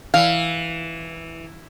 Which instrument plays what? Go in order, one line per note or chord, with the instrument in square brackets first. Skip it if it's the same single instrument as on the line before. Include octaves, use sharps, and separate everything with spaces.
[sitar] E3 [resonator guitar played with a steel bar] F5